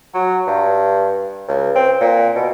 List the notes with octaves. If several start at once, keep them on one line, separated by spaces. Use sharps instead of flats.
F#3
G2
C#2
C4
A#2
B2